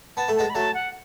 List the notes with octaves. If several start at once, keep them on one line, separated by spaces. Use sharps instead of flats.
B3 A5
A3
G#3 B3 A5
B5
F#3 A3 A5
F#5